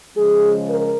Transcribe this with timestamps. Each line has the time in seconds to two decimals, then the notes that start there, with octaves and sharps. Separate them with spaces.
0.15 C#3 F3 G#3 G#4
0.68 A#4